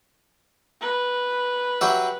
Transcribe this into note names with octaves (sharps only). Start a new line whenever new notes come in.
B4
F#3 G4 E5